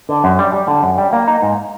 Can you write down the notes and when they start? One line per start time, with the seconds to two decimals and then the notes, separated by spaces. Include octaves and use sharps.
0.09 D3
0.24 F#2
0.39 G3
0.53 G3
0.68 D3
0.83 F#2
0.98 G3
1.13 A#3
1.28 D#4
1.42 G#2